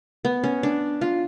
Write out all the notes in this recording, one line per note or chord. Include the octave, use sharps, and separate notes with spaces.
B3
C#4
D4
F4